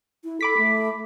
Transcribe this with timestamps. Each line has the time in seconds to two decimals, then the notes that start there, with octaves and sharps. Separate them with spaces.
0.24 E4
0.41 A4 B5 D6 B6
0.57 A3